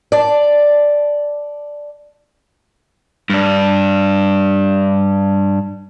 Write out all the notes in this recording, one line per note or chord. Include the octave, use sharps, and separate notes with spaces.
D5 A5
G2 D4